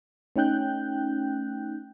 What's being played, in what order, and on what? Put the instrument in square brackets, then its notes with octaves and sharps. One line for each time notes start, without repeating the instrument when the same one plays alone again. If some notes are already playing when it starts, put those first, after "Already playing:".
[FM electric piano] A3 C#4 D#4 G5 F#6 G6